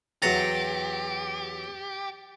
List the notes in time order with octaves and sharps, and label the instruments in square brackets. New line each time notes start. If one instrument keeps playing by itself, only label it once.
[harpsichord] E2 F#3 A#5 [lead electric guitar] G4 [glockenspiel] A6 C#7